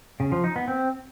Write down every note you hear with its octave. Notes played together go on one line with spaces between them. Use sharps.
C#3
F3
D#4
B3
C4